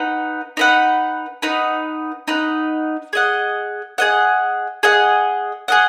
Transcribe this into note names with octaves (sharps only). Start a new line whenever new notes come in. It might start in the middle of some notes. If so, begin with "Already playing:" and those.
Already playing: D#4 B4 F#5
D#4 B4 F#5
D#4 B4 F#5
D#4 B4 F#5
G#4 D#5 F#5
G#4 D#5 F#5
G#4 D#5 F#5
G#4 D#5 F#5